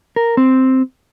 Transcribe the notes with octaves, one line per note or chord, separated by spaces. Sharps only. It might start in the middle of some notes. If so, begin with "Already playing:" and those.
A#4
C4